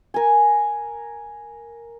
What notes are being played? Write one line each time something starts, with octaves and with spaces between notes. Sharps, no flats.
A#4 G#5